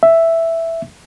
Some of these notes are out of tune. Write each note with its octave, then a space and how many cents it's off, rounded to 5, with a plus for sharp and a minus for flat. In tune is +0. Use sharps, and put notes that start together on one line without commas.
E5 +5